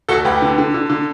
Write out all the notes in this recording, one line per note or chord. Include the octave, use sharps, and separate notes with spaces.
D2 F#4 A4
D2 G4 B4
D3
D3
D3
D3